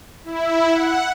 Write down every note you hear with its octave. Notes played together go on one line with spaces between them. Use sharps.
E4
F#5